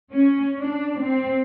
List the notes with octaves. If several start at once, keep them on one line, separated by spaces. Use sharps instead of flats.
C#4
D4
C4